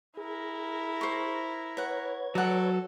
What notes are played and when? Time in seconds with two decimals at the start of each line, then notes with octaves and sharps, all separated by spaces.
0.17 E4 G#4 A#4
1.01 C5 C#6
1.77 B4 C#5 F#5 A#5 G#6
2.35 F#3 A4 D5 F#5